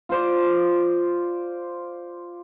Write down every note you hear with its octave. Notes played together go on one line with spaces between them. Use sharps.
F4 C5 D5